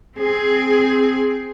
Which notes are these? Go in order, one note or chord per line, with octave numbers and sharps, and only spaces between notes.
C4 G#4